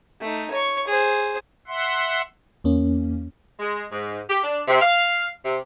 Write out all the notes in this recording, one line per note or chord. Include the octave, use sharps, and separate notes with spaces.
A3 D#4
C#5 C#6
G#4 C5
E5 F#5 C6
E2 A#3 C#4
G#3
G#2
G4
D4
C3
F5
C3